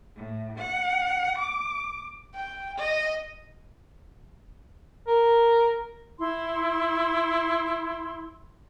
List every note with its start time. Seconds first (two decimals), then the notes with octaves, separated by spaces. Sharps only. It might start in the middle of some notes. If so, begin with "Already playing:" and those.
0.16 A2
0.57 F#5
1.37 D6
2.34 G5
2.78 D#5
5.07 A#4
6.18 E4 C6